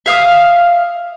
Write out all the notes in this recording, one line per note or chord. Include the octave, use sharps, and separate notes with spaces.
E5 F5 D#6